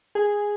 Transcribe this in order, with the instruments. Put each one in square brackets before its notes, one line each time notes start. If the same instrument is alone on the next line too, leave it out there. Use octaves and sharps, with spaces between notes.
[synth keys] G#4